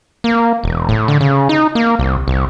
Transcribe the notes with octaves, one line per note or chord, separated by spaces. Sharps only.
A#3
E1
A2
D3
C#3
D#4
A#3
C2
C2